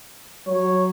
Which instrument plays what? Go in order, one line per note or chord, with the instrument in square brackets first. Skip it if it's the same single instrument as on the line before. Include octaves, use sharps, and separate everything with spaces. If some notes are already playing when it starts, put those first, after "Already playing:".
[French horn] F#3 [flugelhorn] C#5